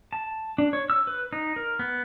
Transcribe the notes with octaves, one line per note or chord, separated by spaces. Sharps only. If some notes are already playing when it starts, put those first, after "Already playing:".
A5
D4
C#5
E6
B4
D#4
A#4
B3